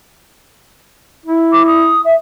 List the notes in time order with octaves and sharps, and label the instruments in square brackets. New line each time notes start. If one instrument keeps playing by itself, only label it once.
[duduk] E4
[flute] D6
D#6
E5